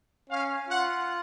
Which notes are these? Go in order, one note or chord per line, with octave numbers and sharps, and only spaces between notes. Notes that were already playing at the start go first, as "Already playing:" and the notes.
C#4 F5
F4 F#5